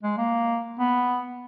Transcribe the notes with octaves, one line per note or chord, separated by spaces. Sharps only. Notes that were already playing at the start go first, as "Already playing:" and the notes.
G#3
A#3
B3